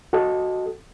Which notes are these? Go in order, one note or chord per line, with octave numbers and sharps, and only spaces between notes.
F#4 A4 D#5